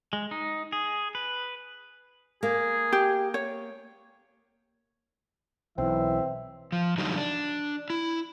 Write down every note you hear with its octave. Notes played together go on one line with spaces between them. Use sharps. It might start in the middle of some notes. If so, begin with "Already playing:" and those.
G#3
D#4
G#4
B4
A#3 G#4
G4
C#5
B1 E3 C4 E5
F3
D3 E3 F#3 G3 A3 D#4
D4
E4